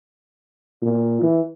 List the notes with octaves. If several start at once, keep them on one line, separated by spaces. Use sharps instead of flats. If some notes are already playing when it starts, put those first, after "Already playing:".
A#2
E3